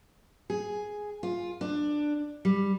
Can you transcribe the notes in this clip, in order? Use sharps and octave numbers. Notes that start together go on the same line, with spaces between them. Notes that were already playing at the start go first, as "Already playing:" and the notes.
G#4
F4
D4
G3